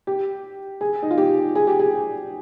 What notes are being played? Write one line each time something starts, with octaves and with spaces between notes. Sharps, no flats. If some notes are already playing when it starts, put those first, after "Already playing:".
G4
G#4
D#4
F4
G4
G#4
G4
G#4